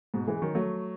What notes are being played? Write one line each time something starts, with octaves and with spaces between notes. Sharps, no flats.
G#2 B2
E3 G#3
D#3 F#3
F#3 A3